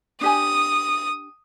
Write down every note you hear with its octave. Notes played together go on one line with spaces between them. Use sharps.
D4 G4 G#5 D#6